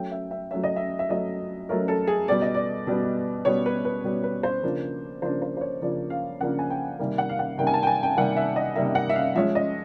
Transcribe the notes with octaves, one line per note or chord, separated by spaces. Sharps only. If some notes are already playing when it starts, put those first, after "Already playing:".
Already playing: F#3 A3 C#4 G5
E5
E5
F#3 A3 C#4 E5
D#5
E5
E5
F#3 A3 C#4 D#5
F#3 A3 C#4 A#4
A4
G#4
B2 G3 B3 D5
D#5
D5
B2 G3 B3
B2 G3 B3 C#5
B4
B4
B2 G3 B3
B4
C5
C#3 F3 A#3 D4
C#3 F3 A#3 D4 C5
C5
C5
C#5
C#3 F3 A#3 D4 D5
F5
C#3 F3 A#3 D4 F#5
G#5
G5
C3 D#3 G3 A#3
F#5
F5
F#5
C3 D#3 G3 A#3 G5
G#5
A5
G5
G#5
G5
C3 D#3 G3 A#3 F#5
E5
D#5
C3 D#3 G3 A#3 E5
F#5
E5
F5
F3 G#3 C#4 E5
D#5